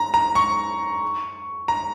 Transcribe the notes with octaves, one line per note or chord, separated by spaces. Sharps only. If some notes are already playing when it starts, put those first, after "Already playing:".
Already playing: A#5
A#5
C#6
A#5